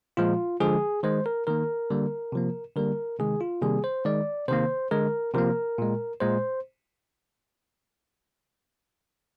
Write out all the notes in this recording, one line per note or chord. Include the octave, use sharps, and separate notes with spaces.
A#2 F3 G#3 F4
D3 F3 G#3 G#4
D#3 G#3 C5
A#4
D#3 A#3 A#4
D3 G3 A#3
C3 F3 A#3
D3 G3 A#3 A#4
C3 D#3 G#3 G#4
F4
C3 D#3 G3 A#3 G#4
C5
D#3 G#3 D5
C3 D#3 A#3 C5
D3 G#3 A#4
C3 F3 A#3 A#4
A#2 G#3
A#2 G#3 C5